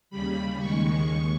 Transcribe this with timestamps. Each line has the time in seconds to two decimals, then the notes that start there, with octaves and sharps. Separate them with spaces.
0.10 D#2 C#3 G3 B5
0.59 D#2 D#3 G#3 C#6
1.08 D#2